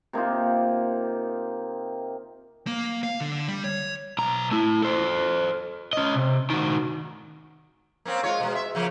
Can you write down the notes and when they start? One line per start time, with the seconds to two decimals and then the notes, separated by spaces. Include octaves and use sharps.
0.13 C3 A#3 D#4 F4
2.67 A#3
3.03 F5
3.21 D3
3.48 G3
3.64 C#5
4.18 B1 A#5
4.51 A3 E4
4.82 A4 C5
5.93 C#4 D#5
6.15 C3
6.50 D#3 F#4
8.05 A#3 C4 C#4
8.23 G#3 F4 C#5
8.40 B2 G#3
8.55 E5
8.75 C#3 F3 A#3